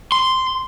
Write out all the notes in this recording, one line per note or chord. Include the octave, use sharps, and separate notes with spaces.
C6